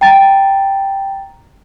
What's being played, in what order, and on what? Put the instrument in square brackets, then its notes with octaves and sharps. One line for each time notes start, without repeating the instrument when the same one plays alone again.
[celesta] G5 A#5 A6